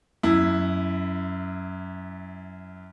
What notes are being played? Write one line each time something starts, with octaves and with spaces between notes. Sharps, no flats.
F#2 E4